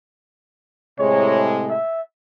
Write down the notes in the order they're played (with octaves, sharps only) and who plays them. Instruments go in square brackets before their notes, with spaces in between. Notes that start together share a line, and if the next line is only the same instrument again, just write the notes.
[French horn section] A2 C3 G#3 [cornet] C#5
[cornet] E5